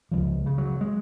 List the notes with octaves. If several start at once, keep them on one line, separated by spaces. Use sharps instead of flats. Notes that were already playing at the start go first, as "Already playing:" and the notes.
C#2 F3
C#3
F#3
G#3